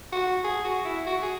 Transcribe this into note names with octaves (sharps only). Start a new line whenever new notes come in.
F#4
G#4
F#4
E4
F#4
G#4